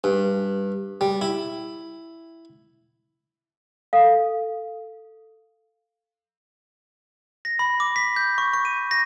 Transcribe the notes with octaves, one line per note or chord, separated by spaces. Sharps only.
G2
G3
E4
A4 F5
A#6
B5
D6
B6
G6
C#6
C#6
D#7
A#6